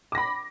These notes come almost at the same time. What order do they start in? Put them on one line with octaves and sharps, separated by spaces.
D6 A#6 B5